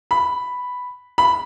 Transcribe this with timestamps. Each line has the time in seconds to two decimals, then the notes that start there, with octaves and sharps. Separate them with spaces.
0.11 B5
1.18 B5